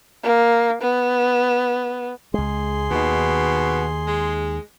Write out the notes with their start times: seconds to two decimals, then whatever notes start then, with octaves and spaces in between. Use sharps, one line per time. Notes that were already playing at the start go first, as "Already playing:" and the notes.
0.23 A#3
0.82 B3
2.34 C#2 G#3 G#4 C6
2.91 D#2 B2 D#3
4.07 G#3